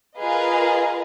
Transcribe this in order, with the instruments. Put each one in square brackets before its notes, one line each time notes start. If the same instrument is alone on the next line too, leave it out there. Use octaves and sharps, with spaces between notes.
[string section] F4 G#4 A#4 B4 D#5 F5